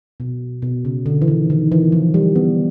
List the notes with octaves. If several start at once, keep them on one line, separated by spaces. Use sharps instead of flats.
B2
B2
C#3
D3
E3
D#3
D#3
E3
F3
G3
B3